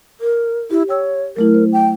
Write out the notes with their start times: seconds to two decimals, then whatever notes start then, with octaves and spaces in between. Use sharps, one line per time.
0.21 A#4
0.71 E4 G4
0.89 C#5 G5 E6
1.36 F#3 A3 E4 A#4
1.54 C5
1.73 G5